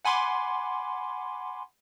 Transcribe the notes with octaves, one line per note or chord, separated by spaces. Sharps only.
F#5 G#5 B5 C6 D6